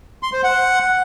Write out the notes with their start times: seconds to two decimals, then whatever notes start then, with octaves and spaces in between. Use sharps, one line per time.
0.23 C6
0.33 C5
0.44 F#5